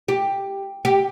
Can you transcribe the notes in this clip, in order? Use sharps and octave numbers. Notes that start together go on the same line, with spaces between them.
G4
G4